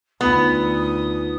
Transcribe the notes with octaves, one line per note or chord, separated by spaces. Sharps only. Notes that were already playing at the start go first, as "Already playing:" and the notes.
D2 B3 D#4 F4 D#6